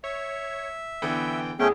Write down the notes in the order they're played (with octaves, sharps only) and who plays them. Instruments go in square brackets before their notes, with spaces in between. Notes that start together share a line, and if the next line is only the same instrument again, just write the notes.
[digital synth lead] C#5 [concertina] E5
[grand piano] D3 E3 B3 [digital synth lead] G5
[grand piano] E2 [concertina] A3 C#4 G5 [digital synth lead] B3 [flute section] G#4